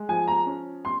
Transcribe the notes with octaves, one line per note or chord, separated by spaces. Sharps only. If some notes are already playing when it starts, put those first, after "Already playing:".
Already playing: G#3
F3 G#5
A#5
C#4
C6